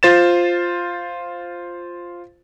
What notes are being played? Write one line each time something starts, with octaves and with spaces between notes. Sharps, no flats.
F4 C5 A6 E7